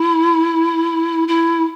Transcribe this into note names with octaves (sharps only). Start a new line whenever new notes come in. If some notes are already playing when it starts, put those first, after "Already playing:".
Already playing: E4
E4